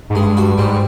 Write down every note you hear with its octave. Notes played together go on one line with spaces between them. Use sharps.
G#2
G2 G#3
F#4
G#2 G3